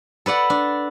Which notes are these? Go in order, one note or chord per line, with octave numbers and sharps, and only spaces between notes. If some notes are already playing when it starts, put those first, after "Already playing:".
A4 B4 D5 F#5
D4